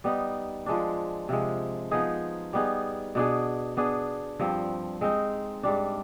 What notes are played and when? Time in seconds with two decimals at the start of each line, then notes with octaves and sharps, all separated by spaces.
0.04 G3 B3 D#4
0.66 F3 G#3 D4
1.29 C3 F3 G#3
1.91 F3 B3 D#4 G#4
2.53 G3 B3 D#4 G#4
3.15 B2 B3 D4 G#4
3.77 B3 D4 G#4
4.39 G2 F3 C4
5.01 G#3 C4 D#4
5.63 G#2 G3 D4